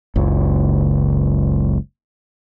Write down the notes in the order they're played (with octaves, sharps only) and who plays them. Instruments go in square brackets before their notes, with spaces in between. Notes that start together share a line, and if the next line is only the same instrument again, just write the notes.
[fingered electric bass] F#1 C#2